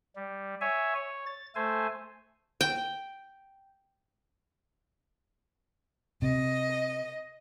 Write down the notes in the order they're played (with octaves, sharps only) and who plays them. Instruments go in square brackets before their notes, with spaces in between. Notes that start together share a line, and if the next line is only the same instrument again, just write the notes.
[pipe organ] G3
C#5 E5 G#5
C#5
A6
A3 A4 C5 G#5
[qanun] G5
[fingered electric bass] C3 [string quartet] D#5